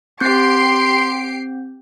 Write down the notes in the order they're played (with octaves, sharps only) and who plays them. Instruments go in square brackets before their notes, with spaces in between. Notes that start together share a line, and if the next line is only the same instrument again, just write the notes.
[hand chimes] C4 G6 [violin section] G4 C7 D7 [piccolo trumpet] C6